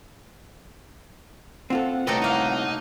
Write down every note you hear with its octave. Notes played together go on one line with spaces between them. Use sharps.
C4 F4 A4 F#5
C2 A2 D#4 F#4 G4 A4 B4
A3 A#3 D#4